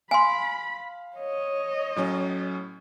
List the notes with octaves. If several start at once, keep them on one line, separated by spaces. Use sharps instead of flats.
F5 G#5 B5 C6
C#5 D#5
A2 F#3 C#4